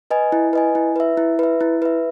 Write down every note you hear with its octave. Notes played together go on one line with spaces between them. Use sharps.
B4 D#5 G#5
E4
B4 D#5 G#5
E4
B4 E5
E4
B4 E5
E4
B4 E5